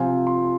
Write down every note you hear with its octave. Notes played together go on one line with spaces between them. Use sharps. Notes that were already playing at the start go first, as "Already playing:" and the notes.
Already playing: C3 F3 C4 F4 G#5
C6